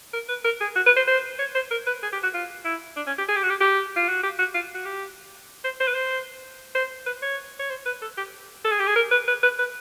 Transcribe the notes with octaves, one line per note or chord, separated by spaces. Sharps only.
A#4
B4
A#4
G#4
F#4
B4
C5
C5
C#5
C5
A#4
B4
G#4
G4
F#4
F4
E4
D4
C#4
G4
G#4
G4
F#4
G4
G4
F4
F#4
G4
F#4
F4
F#4
G4
C5
C5
B4
C5
C5
B4
C#5
C#5
C5
B4
A4
G4
A4
G#4
G4
G#4
A#4
B4
B4
B4
B4